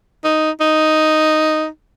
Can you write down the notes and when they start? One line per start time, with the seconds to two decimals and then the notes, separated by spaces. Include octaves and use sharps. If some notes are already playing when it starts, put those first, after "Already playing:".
0.24 D#4
0.61 D#4